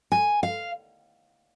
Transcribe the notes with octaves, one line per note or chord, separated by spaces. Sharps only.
G#5
F5